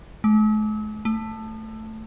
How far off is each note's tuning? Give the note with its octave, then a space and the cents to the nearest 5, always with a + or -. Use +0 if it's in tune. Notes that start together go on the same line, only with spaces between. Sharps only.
A3 -45
A3 +5